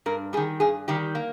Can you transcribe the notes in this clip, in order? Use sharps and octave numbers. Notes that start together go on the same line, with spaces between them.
G2 A#4
D#3 G3 G#4
G2 G#4
D#3 G3 G4
A#3